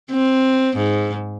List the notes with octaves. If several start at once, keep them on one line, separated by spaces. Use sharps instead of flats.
C4
G#2